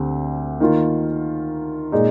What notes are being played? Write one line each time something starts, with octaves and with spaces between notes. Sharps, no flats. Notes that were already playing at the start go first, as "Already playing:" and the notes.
Already playing: D2 D3 C4 G4
D#3 A#3 F4
A#2 G#3 D#4 G#4 D5